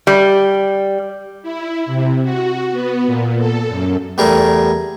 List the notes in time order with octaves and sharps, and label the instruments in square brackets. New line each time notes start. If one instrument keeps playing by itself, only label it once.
[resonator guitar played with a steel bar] G3
[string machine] E4
C3
F#4
B3
A#2
A4
F#2
[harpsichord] E2 G3 A3 G#4 A#4